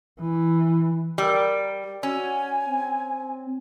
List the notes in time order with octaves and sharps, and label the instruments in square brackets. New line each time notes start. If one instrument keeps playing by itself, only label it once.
[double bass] E3
[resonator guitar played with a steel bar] G3 [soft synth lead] A#4
[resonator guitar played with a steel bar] C#4 [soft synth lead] F#4 [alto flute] G#5
[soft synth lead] C4